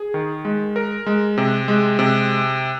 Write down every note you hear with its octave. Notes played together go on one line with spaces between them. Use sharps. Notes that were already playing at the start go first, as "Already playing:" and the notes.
Already playing: G#4
D#3
G#3
A#4
G#3
C3
G#3
C3